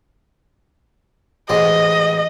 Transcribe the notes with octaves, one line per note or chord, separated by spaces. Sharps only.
A1 G#2 G#3 D#5